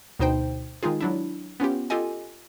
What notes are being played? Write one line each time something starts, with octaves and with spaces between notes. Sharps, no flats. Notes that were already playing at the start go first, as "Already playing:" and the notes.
D2 B2 D#4 C5 G5
D#3 G#3 D#4 F4 G#4
F#3 D4 E4
B3 C#4 F4 G4
F4 G4 A4 D#5 G#5